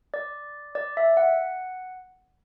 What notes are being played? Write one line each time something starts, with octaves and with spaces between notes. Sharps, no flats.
D5
D5
E5
F#5